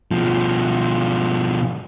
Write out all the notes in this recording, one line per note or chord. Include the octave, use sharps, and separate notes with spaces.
B2 F3